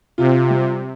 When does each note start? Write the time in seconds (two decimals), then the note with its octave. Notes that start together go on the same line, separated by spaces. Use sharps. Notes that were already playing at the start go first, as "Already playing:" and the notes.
0.18 C3 F4
0.50 G3